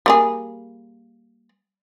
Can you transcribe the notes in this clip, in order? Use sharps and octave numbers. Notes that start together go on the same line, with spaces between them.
G3 A#3 G#4